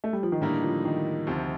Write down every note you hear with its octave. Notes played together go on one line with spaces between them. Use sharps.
A3
G3
F3
D#3
A2 D3 G3 A#3 D#4
F3
D#3
D2 C3 F3